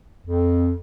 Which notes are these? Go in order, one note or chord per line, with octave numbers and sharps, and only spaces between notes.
F2